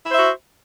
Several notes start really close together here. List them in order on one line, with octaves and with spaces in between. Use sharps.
E4 C5 E5 F#4